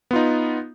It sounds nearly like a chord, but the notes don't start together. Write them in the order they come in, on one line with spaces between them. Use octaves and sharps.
B3 F4 D#4